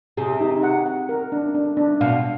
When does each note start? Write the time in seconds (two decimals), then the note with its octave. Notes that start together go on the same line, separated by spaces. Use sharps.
0.17 C3 G#4
0.40 D#4
0.63 F#5
0.86 F#5
1.09 A#4
1.32 D4
1.55 D4
1.77 D4
2.01 B2 F5